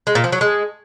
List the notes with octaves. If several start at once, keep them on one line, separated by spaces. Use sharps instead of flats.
G#3
A#2
F3
F#3
G#3